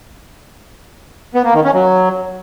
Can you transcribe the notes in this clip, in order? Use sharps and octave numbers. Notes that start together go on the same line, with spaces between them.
B3
A#3
D#3
C#4
F#3